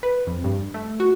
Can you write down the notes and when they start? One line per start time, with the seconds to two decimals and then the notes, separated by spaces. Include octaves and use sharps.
0.03 B4
0.27 F2
0.44 G2
0.74 A3
1.00 F#4